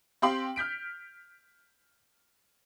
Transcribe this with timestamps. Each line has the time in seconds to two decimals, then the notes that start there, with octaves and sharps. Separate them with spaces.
0.22 C4 G4 F5 G5 C6 F#7
0.56 F6 G6 B6 D7